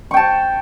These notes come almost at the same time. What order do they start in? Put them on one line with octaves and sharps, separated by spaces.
C#6 G5 A5